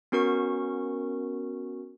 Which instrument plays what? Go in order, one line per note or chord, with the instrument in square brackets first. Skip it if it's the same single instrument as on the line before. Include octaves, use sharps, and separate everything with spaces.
[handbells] B3 C#4 F#4 A#4 C#6